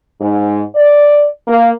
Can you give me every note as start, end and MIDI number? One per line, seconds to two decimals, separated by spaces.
0.20 0.62 44
0.76 1.26 74
1.47 1.69 58